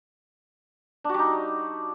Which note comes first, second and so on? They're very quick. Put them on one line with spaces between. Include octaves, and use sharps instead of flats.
D4 F#4 G3 D#4